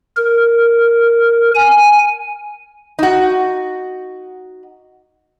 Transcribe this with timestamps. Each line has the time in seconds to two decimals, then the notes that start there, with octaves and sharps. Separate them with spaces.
0.17 A#4
1.55 G#5
2.99 D#4 F#4